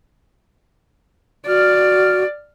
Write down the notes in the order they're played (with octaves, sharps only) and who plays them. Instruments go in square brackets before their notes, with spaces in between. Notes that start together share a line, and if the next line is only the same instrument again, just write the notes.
[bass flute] F#4 [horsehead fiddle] D5 [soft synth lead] F6